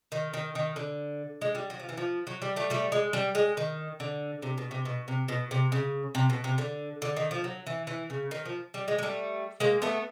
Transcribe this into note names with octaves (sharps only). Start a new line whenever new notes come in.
D#3
D#3
D#3
D3
G#3
G3
F#3
F3
E3
F3
F#3
G3
G3 A3
G3 A3
G#3
G3
G#3
D#3
D3
C3
B2
C3
B2
C3
B2
C3
C#3
C3
B2
C3
D3
D3
D#3
F3
F#3
E3
E3
C#3
D#3
F3
G3
G#3
G#3
G3 A3
G#3 A#3
A3 B3